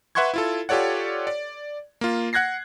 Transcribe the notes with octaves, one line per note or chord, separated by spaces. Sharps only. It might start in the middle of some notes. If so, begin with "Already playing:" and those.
B4 E5 F#5 C6 C#6 G#6
E4 F4 A4
F4 G4 A4 C#5 D5 F#5
D5
A#3 F4
F#5 F#6 G#6 A#6 C7